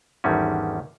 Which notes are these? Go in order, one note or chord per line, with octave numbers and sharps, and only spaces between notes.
G#1 E2 D3 D#3 G3 C#4